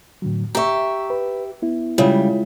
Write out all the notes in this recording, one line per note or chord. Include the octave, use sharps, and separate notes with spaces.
A2 D3 F#3
G4 E5 A#5 C#6
B4
B3 E4
C#3 G3 G#3 E4 F4